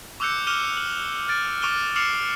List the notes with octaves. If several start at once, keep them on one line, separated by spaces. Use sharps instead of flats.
C#6 D6 E6 F#6 G6 C#7
D6 F6 D#7 E7 G7
F#7
F6 A6 D7
C#6 D6 D7 D#7 G7
D6 F6 C7 C#7 E7 F#7